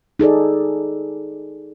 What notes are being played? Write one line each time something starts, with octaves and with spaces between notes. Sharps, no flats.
D#4 G#4 A4 D5